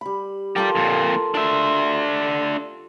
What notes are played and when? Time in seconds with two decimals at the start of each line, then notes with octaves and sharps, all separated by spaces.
0.01 G3 B5
0.56 F4 G4 A4 A#4 D5
0.76 F2 A#2
1.34 D4 E5 C6